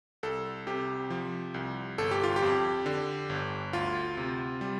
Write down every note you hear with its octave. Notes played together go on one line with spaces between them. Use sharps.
C2 A4
C3 G4
F3
C2
G1 A4
G4
F4
G4
F2
D3
G1
D2 F4
C3
G3